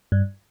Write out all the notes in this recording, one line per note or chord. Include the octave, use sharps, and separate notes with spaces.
G2